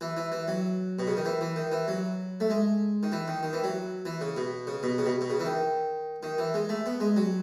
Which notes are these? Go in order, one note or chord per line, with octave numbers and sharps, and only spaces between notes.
E3
E3
E3
F#3
B2
C#3
D#3
E3
E3
D#3
E3
F#3
A3
G#3
D#3
E3
D#3
D#3
E3
F#3
E3
C#3
B2
C#3
B2
C#3
B2
B2
C#3
E3
D#3
D#3
E3
G#3
A3
B3
G#3
F#3